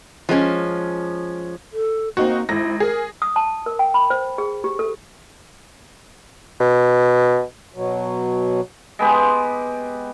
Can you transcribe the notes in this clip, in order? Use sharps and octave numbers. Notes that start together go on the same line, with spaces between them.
F3 G#3 C4 C#4
A4
A#3 C4 D#4 F#4
G#1 E4 A#6
G#4 A#4
D#6
A5
A#4
G5
B5
C5
G#4
G4
A4
B2
B2 F#3
G#3 B3 G4